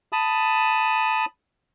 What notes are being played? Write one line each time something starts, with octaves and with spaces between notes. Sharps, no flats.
A5 B5 D#6